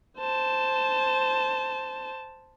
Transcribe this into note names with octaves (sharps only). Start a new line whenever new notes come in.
C5 A5